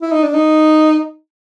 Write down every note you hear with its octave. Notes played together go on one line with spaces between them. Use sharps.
E4
D#4
D4
D#4